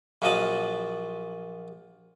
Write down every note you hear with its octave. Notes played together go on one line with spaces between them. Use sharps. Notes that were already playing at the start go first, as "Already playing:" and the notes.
A#1 A#2 F3 F#3 D#5 A5